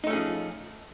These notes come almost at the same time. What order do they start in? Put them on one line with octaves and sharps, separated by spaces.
D#4 A3 C#4 G#4 F3